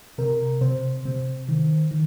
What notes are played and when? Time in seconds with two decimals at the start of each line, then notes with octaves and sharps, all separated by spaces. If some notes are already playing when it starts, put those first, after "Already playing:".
0.18 C3 A#4
0.61 C3 C5
1.05 C3
1.48 D#3
1.91 D#3